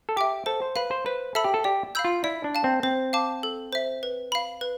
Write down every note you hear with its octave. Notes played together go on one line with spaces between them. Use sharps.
A4
G4 E5 G5 D6
A4 C5
C5
B4 F5 B5
C5
B4 C5
A4 E5 B5 E6
G4
A4
G4 D5
F5 B5 E6 G6
F4
E4 D5
D4
F5 A5
C4
C4 C5
F5 A5 D6
A4
C5 E5
B4
F5 B5
B4